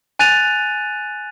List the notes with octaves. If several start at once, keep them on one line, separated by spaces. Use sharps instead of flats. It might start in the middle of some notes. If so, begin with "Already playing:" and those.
G#5 F#6 A6 D#7 F7